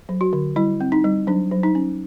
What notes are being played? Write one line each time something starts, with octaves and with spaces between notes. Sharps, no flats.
F#3
F#4
D3
G3 E4
C4
D#4
G3
F#3 D4
F#3
D#4
C#4